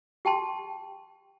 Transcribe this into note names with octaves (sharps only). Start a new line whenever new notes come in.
G4 G5 A5 C6